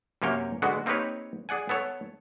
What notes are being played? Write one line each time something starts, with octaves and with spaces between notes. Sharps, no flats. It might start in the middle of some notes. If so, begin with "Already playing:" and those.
F#2 C3 A#3 C#4 C#5 G5
D3 G#3 B3 F#4
A#3 C4 D#4 G4 B4 C#5
G#4 D5 F#5 G#5
B3 A4 C#5